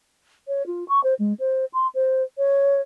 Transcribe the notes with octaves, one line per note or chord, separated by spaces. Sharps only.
C#5
F4
C#6
C5
G#3
C5
C6
C5
C#5